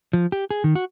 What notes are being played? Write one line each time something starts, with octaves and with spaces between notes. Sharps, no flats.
F3
G4
G#4
D#3
F#4